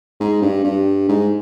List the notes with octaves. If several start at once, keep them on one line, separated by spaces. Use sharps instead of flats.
G#2
G2
G2
G#2